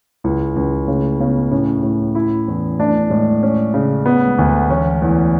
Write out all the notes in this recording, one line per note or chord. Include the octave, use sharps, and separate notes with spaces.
C#2 E4
C#2 C#4
C#3 A3
C#3 B3
A2 C#4
A2
E4
E2
A3 D4
A2 G#3
C#4
C#3
A3 B3
G#3
D2
A3
E3 C#4
E2 F#3